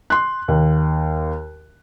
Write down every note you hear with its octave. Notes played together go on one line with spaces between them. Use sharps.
C6 F#6
D#2